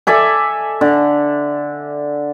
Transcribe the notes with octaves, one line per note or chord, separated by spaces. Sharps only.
A4 D5 E5 G#5
D3